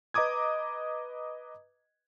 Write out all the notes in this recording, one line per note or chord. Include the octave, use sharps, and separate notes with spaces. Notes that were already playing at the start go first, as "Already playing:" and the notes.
B4 D#5 A#5 D6 D#6 G#6